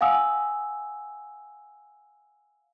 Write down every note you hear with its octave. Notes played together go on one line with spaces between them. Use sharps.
F5 F#5 G#5 D#6 E6